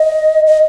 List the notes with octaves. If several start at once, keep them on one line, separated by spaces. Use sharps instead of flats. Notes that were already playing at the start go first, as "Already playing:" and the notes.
Already playing: D#5
D#5